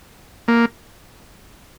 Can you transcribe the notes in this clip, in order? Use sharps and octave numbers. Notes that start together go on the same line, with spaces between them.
A#3